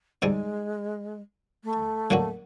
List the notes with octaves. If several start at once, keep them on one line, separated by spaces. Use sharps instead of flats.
D3 G3 G#3 C4 D#4 G#4
A3
D3 F#3 A#3 C#4 F#4